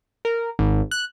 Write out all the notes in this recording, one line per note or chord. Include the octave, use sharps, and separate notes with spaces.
A#4
G#1
F#6